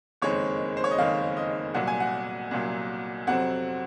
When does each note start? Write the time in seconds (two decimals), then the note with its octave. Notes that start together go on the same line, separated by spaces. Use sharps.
0.22 F#1 F2 D#3 G#3 C4 C#5
0.77 C5
0.84 C#5
0.91 D#5
0.98 F#1 F2 D#3 G#3 C4 F5
1.37 D#5
1.74 C2 A#2 F#3 F#5
1.87 G#5
2.00 F#5
2.51 C2 A#2 F#3
3.27 F2 C3 F#3 C4 F#5